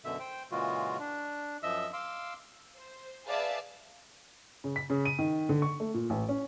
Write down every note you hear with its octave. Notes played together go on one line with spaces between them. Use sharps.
F#2 B2 D3 E5
C5 G5
A#2 C#3 E3 G#3 F4 F#4
D4
F#2 F3 D#5 E5 E6
F5 C6 D6 E6
C5
G#4 B4 D5 E5 F5 A5
C#3
B6
C#3
D#7
D#3
D3
C#6
A3
A#2
A1
C#4